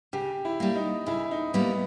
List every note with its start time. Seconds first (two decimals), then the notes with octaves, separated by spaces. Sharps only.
0.13 C#3 G4
0.45 E4
0.60 G3 A#3
0.76 D#4
1.06 C#3 E4
1.31 D#4
1.54 G3 A#3 B3